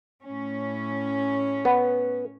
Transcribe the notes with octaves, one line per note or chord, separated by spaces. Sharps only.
A2 C#4
B3